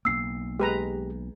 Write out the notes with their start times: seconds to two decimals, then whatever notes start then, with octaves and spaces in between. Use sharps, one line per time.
0.05 B1 A#3 E6 C7
0.60 G#3 G4 B4 A#5